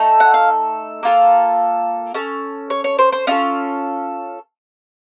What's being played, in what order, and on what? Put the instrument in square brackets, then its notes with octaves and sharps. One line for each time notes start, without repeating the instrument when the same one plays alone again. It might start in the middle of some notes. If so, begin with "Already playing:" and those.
Already playing: [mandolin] A3 D#4 A4
F#5
F5
A#3 F4 A4
C#4 A4
C#5
C#5
C5
C5
C#4 F4 A4 D#5